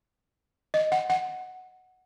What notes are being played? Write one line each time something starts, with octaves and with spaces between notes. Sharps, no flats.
D#5
F#5
F#5